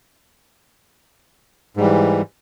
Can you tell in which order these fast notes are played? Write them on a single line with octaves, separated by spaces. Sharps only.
G#2 G3 E3